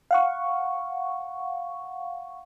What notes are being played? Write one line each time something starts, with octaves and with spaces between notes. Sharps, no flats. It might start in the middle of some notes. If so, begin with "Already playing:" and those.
F5 F#5 C#6